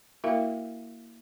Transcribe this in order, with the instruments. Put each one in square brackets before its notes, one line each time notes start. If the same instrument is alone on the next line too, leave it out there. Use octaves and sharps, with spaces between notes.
[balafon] A#3 E4 F#4 A#4 E5 F5